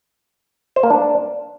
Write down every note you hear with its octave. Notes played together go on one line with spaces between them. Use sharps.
C5
A#3
D4